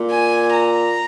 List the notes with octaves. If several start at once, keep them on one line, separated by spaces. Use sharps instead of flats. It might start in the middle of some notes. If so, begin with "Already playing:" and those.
Already playing: A#2
G#5
A#5